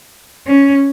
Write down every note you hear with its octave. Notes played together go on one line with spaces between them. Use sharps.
C#4